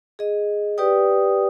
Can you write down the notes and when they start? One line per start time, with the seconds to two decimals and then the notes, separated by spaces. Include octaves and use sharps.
0.19 G#4 D#5
0.78 G4 B4 D5 G5 D#6